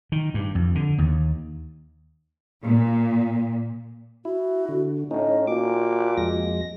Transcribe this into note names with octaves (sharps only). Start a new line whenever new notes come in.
D#3
G2
F2
D3
D#2
A#2
E4 F#4
D3
A2 C#4 D#4 D#5
A#2 F#4 D6
F2 G#3 A#6